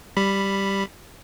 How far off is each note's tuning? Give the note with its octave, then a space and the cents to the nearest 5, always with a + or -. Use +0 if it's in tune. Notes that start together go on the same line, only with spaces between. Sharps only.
G3 +0 B5 +0